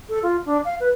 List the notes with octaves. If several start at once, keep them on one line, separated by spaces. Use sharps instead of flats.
A4
F4
D4
F5
B4